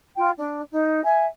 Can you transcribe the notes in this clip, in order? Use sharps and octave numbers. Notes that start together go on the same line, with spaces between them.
F4 G5
D4
D#4
E5 G#5